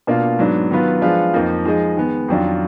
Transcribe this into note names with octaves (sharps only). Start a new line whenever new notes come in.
B2 A#3 D4 F4
G#2 F#3 B3 D4
D#3 F#3 B3 F4 B4
F3 G#3 D4 F4 B4
F2 F3 A#3 D#4
F3 G#3 D#4 G#4 D#5
D#3 G#3 B3
F2 D#3 F#3 D4 F4